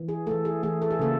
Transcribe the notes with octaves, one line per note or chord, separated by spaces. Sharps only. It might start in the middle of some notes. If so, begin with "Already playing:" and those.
Already playing: E3
G#4
E3 A3 A4
G#4
E3 A3 G#4
A4
G#4
C#3 F3 A#3 A4